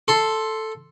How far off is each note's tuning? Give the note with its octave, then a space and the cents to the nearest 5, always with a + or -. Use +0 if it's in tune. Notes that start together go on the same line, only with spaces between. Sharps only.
A4 +0 C6 +5